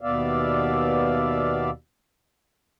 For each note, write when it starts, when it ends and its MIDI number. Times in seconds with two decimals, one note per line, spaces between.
0.01 1.70 39
0.01 1.70 47
0.01 1.70 59
0.01 1.70 74
0.01 1.70 76
0.01 1.70 77